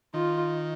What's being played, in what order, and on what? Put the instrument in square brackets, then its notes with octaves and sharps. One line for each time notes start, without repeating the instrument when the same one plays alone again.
[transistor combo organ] D#3 [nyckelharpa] F4